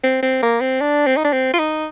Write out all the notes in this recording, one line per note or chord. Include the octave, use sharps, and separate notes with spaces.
C4
C4
A#3
C4
D4
C4
D#4
D4
C4
F4
D#4